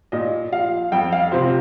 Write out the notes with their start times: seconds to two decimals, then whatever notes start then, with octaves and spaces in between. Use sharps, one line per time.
0.12 A#2 D#5
0.52 F3 F5
0.92 F2 G5
1.13 F5
1.32 C3 F3 C5